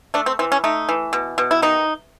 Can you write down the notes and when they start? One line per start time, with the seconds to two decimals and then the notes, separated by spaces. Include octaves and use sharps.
0.14 A3 D4
0.26 C4
0.39 E3 C4
0.52 C#4
0.64 A3 D#4
0.89 E3
1.13 B2
1.38 B2
1.51 E4
1.62 D#3 D#4